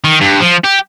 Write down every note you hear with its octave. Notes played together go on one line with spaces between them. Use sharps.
D#3
G2
F3
G4